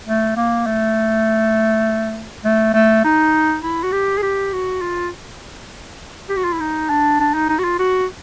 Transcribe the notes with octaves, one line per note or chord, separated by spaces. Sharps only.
A3
A#3
A3
A3
A3
D#4
E4
F#4
G4
G#4
G4
F#4
F4
G4
F#4
F4
E4
D#4
D4
D4
D#4
D#4
F#4
F4
F#4